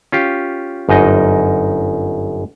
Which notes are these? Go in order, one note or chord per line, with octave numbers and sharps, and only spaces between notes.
C#4 F4 G4
G1 F#2 D#4 D#5